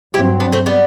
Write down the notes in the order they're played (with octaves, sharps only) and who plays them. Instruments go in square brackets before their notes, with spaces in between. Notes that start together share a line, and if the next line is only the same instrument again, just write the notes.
[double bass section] G2 F#3 C4 [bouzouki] E4 G4
[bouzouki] B3 D4
A3 C4
G3 B3